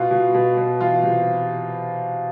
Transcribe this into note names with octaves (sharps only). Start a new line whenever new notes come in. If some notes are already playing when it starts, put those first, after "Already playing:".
Already playing: B2 F4
B2
B2
B2
E3 F4
C3